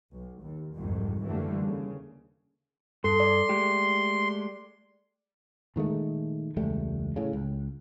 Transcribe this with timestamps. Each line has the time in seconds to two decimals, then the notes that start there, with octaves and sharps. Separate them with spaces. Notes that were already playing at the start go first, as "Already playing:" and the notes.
0.12 B1
0.41 D#2
0.75 F#1 C2 F2 G#2 C3 D#3
1.24 F#2 D3 E3 G3 A3 A#3
1.64 D#2 C#3
3.04 G2 A4 C6
3.20 D5
3.49 G#3 A3 G4
5.76 A#2 D#3 G#3 A3
6.57 E1 C#2 G3 A3
7.16 A2 C#3
7.33 C#2